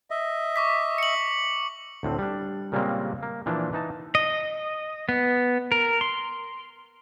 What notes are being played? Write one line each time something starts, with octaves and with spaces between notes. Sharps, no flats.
D#5 E5
C#6 D6 B6
C#7 F#7
D2 A2 C4
G3 D4
A#2 C#3 G3 G#3 A#3 C4
A#3
A#2 E3 F3 D4
E3 D#4 A5
D#5
B3
A#4
C6